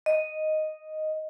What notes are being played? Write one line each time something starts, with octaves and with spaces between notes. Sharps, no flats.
D#5